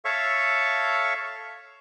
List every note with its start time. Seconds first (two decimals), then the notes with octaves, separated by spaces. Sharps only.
0.05 A4 C#5 E5 F5 C#6